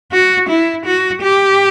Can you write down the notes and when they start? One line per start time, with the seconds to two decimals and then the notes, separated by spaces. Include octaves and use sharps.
0.12 F#4
0.49 E4
0.86 F#4
1.22 G4